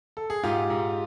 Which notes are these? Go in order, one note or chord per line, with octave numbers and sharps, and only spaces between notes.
A4
G#4
G#2 F4 G4
G#2